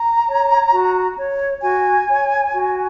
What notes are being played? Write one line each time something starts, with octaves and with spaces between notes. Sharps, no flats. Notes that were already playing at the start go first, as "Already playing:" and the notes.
Already playing: A#5
C#5
F#4
C#5
F#4 G#5
C#5
F#4